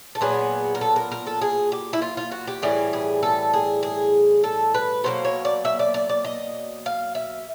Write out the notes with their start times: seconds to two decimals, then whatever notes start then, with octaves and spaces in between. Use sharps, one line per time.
0.15 A4
0.21 A#2 F#3 B3 G#4
0.75 A#4
0.81 A4
0.96 A#4
1.12 A#4
1.27 A4
1.41 G#4
1.72 G4
1.93 E4
2.02 F4
2.17 F4
2.32 F#4
2.48 G4
2.62 A2 E3 G3 G#4
2.93 G#4
3.23 A4
3.54 G#4
3.83 G#4
4.44 A4
4.74 B4
5.04 B2 F#3 A#3 C5
5.25 C#5
5.45 D5
5.65 E5
5.79 D5
5.94 D5
6.09 D5
6.24 D#5
6.86 F5
7.15 E5